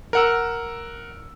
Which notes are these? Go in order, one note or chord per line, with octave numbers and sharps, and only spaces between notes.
A#4 F#5 E6